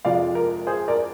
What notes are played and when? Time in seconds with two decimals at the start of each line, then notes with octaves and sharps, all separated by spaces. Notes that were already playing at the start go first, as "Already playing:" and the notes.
0.05 F2 C3 F3 G#3 D5 F5
0.35 A#4
0.67 G#4 C5
0.88 A#4 D5